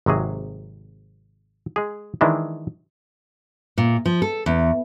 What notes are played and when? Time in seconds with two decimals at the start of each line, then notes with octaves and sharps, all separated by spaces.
0.06 G#1 C3 F#3 G#4
1.76 G#3 G#4
2.21 D#3 E3 G#3 D4 E4
3.78 A#2
4.06 F3
4.22 A4
4.46 E2